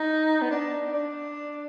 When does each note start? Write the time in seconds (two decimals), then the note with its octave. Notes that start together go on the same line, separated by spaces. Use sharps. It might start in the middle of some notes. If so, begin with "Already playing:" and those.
Already playing: D#4
0.42 B3
0.51 D4
0.94 D4